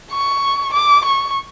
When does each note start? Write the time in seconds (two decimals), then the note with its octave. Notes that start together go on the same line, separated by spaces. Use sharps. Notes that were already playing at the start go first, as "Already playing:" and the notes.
0.11 C#6
0.74 D6
1.05 C#6